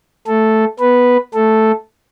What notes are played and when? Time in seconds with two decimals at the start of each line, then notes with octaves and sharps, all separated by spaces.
0.27 A3 A4
0.80 B3 B4
1.34 A3 A4